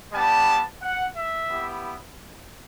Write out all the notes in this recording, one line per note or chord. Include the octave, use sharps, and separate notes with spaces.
G3 B3 D4 A5
F#5
E5
B3 E4 G4